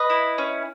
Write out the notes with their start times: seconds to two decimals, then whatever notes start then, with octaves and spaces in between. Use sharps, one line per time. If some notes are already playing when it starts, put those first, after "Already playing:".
Already playing: B4 D#5
0.10 E4
0.38 C#4